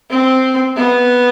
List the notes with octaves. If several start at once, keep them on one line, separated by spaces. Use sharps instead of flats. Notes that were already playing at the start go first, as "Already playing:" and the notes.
C4
B3